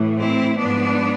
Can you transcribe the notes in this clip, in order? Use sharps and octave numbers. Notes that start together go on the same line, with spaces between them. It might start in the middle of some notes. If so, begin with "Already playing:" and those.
Already playing: A2 E3
C4 E4
G#2 F3 B3 D4